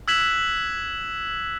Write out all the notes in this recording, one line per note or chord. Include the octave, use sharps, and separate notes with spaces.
E6 F#6 G#6 B6 E7 F#7